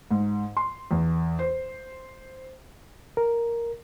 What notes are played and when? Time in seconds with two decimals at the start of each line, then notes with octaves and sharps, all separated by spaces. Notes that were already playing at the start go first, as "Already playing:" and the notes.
0.11 G#2
0.57 C6
0.91 E2
1.39 C5
3.17 A#4